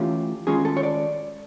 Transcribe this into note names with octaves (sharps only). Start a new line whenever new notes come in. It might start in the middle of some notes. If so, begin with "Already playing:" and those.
Already playing: E3 A3 C#4 F4 G4
D#3 G#3 C#4 F4 G#4
A4
C#5
D5